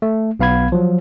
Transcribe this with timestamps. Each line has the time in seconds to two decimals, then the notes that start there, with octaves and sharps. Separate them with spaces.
0.02 A3
0.40 B1 B3 F5 B5 G#6
0.72 F3 F#3